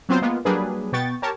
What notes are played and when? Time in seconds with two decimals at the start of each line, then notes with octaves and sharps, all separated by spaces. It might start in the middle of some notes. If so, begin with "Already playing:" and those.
0.09 F#3 B3 C4 F4 C5
0.22 G#3 A#3 B3 F4
0.45 F#3 G3 A#3 D4 G#4 B4
0.92 B2 B3 G5 C#6 A6
1.22 G4 A#4 C#5 A5